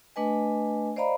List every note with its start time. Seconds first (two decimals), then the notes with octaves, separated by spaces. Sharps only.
0.16 A3 D4 B4 D#5 G#5
0.96 C5 D5 D#5 F5 A#5 B5